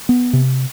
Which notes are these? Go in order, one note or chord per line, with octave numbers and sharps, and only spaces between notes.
B3
C3